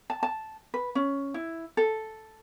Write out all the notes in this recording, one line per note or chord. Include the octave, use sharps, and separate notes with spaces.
A5
A5
B4
C#4
E4
A4